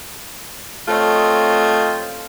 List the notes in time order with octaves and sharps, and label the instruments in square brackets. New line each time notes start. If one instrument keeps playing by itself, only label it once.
[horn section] A3 C4 F4 C#5 D#5